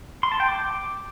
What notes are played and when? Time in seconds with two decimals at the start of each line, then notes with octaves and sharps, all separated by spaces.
0.23 C6
0.32 A5
0.40 G5
0.48 D6